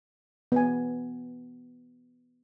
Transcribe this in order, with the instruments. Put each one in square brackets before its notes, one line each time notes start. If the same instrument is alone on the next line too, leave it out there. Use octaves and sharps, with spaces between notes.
[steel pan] B3 G#5